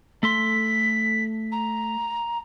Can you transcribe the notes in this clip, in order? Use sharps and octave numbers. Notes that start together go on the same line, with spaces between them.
A3 A4 C6 B6
A#5